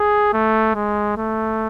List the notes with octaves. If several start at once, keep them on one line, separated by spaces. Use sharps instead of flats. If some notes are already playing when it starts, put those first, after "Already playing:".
Already playing: G#4
A3
G#3
A3